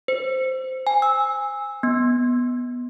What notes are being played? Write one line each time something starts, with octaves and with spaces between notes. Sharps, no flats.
C5
G#5
E6
B3